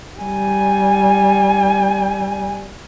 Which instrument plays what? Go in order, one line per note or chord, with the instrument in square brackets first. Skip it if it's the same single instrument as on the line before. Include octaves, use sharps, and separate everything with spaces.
[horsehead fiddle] G3 G#5